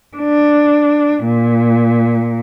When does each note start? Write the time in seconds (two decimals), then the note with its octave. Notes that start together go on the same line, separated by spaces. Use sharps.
0.17 D4
1.25 A#2